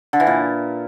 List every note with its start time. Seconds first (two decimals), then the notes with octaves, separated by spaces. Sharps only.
0.13 D3
0.20 E3
0.27 A#2